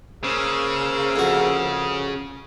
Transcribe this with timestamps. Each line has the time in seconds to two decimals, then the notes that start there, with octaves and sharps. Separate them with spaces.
0.24 C#3 A#3 G#4 A#4 C5 F5 E6
1.16 F2 F#4